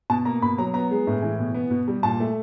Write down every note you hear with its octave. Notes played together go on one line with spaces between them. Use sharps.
B2 A5
A#3 A#5
B2 B5
F#3 A#5
B3 A#5
G#3
A2
E3
B2
B3
B2
G3
A#2 A5
A3